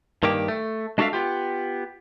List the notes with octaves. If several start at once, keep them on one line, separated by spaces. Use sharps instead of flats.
G2 D#3 A#3 G4
A3
G#3 D4 F#4 A4 E5 F5
B3 F4 G4